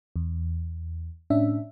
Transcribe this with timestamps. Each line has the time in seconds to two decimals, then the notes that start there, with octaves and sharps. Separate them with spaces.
0.16 E2
1.30 A2 C#4 D4 E5